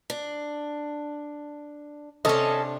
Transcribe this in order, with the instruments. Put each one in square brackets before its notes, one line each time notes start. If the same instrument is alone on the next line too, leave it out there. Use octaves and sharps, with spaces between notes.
[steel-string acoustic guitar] D4
[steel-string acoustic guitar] C3 D4 [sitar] C#4 A4 D#5